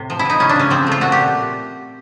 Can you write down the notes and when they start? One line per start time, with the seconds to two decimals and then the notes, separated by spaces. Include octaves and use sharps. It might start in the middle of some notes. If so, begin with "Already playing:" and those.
Already playing: A2 C3
0.10 F3
0.19 E4
0.25 F3 D#4
0.40 C#3 C#4
0.49 D4
0.56 C#3 C#4
0.70 F3 C4
0.87 A3 F4
1.01 A#2 F#4
1.12 G4